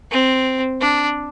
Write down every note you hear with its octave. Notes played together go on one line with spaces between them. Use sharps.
C4
D4